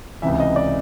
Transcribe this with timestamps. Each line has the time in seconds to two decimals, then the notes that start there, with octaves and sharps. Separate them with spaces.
0.22 C#2 C3 E3 E5
0.40 D#5
0.56 D5